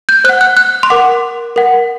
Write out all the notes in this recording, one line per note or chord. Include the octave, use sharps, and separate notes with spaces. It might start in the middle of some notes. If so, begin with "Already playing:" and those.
G6
C5 F#5 F#6
F#6
F#6
C6
A#4 F#5 D6
A#4 F#5